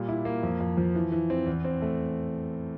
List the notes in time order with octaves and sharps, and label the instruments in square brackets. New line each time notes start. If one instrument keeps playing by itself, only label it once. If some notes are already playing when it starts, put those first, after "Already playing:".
Already playing: [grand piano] A#2 G3
E4
A#3
F2
F2
F3
E3
E3
C4
E2
C4
A3